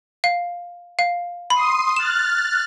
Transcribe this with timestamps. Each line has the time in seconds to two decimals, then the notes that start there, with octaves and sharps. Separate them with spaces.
0.24 F5
0.99 F5
1.50 B5 C6 D#6
1.96 F6 F#6 A6 E7